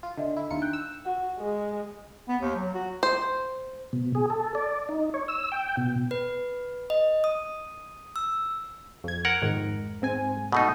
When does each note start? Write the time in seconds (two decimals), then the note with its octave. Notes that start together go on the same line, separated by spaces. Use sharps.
0.03 F4
0.17 D3 D4 D#5 E5
0.37 E4
0.51 D#2 D4 D#4 F4 A#5 C#7
0.62 G5 F#6
0.73 E6
1.05 F#4
1.39 G#3
2.29 B3
2.41 D#2
2.55 F#3
2.74 F#4
3.03 C5
3.93 B2
4.15 G#4
4.30 A4
4.55 D5
4.89 D#4
5.14 C#5
5.28 E6
5.52 G5
5.77 B2
6.11 B4
6.90 D#5
7.24 D#6
8.16 E6
9.04 F2 G#6
9.25 A#4 F#5
9.42 F2 G#2 D#3
10.02 G#2 C4 G#5
10.52 B2 A3 D#4